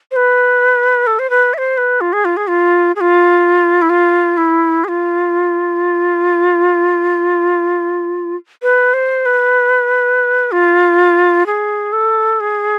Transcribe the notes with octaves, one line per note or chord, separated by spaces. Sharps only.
C5
B4
A4
C5
B4
E5
C5
B4
F4
G#4
F4
G#4
F4
G#4
F4
E4
F4
E4
G#4
F4
B4
C5
B4
F4
G#4
A4
G#4